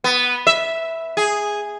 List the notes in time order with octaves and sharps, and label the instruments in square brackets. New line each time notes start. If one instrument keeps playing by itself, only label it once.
[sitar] B3
E5
G#4